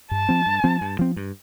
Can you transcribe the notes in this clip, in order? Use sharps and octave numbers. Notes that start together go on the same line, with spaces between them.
G2 A5
F3 C4
G2
F3 C4
G2
F3 C4
G2